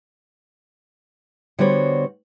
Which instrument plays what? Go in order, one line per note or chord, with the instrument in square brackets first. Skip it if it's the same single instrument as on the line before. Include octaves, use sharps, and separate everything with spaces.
[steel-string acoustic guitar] D3 G3 B3 F#4 C5 C#5